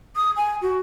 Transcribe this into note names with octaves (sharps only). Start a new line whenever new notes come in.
D#6
G#5
F#4